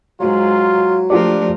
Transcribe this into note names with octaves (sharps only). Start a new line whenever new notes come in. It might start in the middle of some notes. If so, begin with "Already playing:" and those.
G#2 F#3 F4
F3 A3 D4 F4 G4 A#4 D5